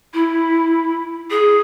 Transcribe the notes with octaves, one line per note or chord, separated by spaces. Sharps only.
E4
G#4